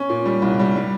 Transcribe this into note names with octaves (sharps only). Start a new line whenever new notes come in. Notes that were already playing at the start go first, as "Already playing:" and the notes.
Already playing: C#4
A#2
G3
C2
G3
G3